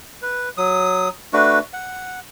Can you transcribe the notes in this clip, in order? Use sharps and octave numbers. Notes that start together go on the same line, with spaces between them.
B4
F#3 D#6
A3 D4 F#4 B4
F#5